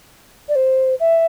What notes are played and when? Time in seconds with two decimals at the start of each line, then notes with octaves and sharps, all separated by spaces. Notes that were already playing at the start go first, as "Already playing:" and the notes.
0.48 D5
0.55 C5
1.00 E5